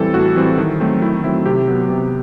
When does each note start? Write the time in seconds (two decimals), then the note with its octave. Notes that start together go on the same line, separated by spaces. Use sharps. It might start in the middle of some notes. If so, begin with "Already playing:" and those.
Already playing: A2 E3 G3 C4 A4
0.14 A2 F#4
0.36 E3 G3 C4
0.58 D#3
0.80 F#3 A3 C4
1.02 D#3 E4
1.24 F#3 A3 C4 E4
1.46 C3 G4
1.68 F#3 B3
1.90 C3